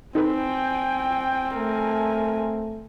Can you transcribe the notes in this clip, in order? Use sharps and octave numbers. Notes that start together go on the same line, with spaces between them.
C4 D#4 A4 B4 G5 G#5
A3 A#4 G#5